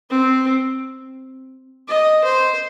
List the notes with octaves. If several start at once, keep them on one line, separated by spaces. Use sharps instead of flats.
C4
D#5
C5